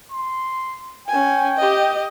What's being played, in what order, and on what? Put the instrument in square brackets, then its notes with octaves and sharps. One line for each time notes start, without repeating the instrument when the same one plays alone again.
[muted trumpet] C6
[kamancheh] C#4 G#5 [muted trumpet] G5
[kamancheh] G4 D#5